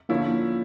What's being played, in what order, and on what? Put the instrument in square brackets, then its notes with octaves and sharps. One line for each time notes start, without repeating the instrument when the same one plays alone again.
[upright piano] D3 F3 C#4 E4 [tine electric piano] A#3